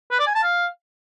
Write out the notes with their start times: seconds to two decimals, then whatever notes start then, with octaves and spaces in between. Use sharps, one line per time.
0.11 B4
0.19 D5
0.27 G#5
0.35 A5
0.43 F5